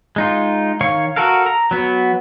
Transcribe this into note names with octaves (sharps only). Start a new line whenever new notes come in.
G#3 D#4 F4
D#3 C#5 F5 C#6
F#4 A4 A#4 F5
A#5
F#3 B3